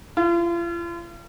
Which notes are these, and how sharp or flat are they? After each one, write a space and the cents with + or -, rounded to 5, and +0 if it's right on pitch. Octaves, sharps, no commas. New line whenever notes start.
F4 -40